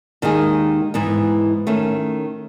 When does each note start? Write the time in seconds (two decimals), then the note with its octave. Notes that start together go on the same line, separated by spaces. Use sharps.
0.22 D#2 D#3 G#3 D#4 G#4
0.94 G#2 E3 B3
1.67 D#3 A3 C#4